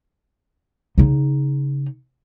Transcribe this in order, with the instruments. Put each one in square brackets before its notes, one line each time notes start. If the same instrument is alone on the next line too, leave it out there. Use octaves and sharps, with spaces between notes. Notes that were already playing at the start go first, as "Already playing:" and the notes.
[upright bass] C#3 D#4